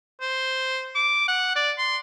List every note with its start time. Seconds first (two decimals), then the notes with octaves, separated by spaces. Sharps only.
0.21 C5
0.95 D6
1.28 F#5
1.56 D5
1.78 C6